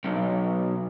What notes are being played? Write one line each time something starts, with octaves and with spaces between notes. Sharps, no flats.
B1